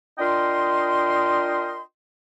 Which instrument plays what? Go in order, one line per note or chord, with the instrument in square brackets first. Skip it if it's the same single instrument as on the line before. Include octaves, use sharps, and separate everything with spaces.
[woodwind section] D4 F4 A#4 D#5 G5 C6